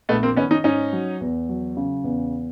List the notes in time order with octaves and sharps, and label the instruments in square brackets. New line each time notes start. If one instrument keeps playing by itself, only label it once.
[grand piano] A#1 [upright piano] A3 B3
[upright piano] A#3 C4
[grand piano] D#3 [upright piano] B3 C#4
[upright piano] C#4 D#4
[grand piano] G#2 [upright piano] C#4 D#4
[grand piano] F#3
E2
F#3
C#3
E2